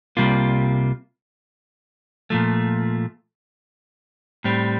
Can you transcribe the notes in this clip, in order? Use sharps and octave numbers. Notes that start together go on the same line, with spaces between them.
C2 C3 G3 A#3 F4
A#2 F3 A3
A2 G3 C4